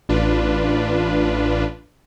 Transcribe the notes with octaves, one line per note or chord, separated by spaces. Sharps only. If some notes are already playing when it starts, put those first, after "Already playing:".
A1 D4 F4 B4